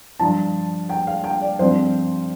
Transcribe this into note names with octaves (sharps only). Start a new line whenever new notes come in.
G2 F3 D4 F4 A5
G5
F5
G5
D5
G2 F3 C4 F4 C5